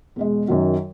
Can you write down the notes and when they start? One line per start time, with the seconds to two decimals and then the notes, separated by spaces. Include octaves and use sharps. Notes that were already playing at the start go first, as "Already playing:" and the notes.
0.16 E2 B2 G#3
0.48 F#2 D#3 F#3